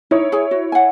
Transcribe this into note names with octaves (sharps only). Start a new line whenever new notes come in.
D#4 E4 C#5
G#4 G#5
F#4
F#5 G#5